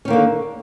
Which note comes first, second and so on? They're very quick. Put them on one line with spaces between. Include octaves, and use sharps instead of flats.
C#4 D#3 A#3 D3